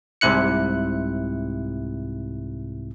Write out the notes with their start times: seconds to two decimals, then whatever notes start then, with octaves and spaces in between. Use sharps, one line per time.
0.21 C2 G#2 C3 E4 F#6 C#7